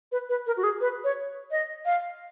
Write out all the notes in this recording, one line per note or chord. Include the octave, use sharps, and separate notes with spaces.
B4
B4
A#4
F#4
G#4
B4
C#5
D#5
F5